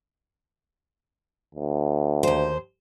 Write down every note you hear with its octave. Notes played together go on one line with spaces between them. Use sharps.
D2
D#2 C5